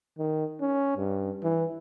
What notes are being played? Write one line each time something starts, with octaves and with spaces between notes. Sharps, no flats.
D#3
C#4
G2
E3